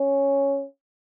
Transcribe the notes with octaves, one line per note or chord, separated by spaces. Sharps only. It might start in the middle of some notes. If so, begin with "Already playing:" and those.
Already playing: C#4